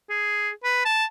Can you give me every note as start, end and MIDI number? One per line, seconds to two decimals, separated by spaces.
0.10 0.50 68
0.64 0.84 71
0.85 1.05 81